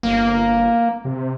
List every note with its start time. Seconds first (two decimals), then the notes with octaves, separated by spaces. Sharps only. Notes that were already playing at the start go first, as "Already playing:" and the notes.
0.03 G1 A#3
1.05 C3